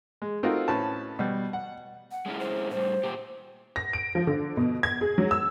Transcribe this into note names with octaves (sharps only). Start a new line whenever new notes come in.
G#3
A3 C4 D#4 F4 F#4 A#4
A2 C#4 B4 A5
B2 G3
F#5
F#5
G#3 C#4 E4
C5
A2 G3 C5
A#2 G4
A#6
D7
F3
D3
B2
G#6
G#4
F#3
E6